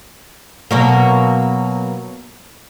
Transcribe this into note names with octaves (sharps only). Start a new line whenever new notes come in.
B2 F#3 A#3